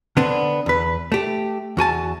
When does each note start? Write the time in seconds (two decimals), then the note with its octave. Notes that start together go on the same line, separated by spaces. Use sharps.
0.17 D3 B3 C4 D4
0.66 E2 B4
1.12 A3 G4
1.77 E2 F#4 G#5 A5